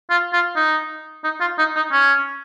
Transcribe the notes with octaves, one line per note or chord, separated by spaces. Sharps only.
F4
F4
D#4
D#4
F4
D#4
D#4
C#4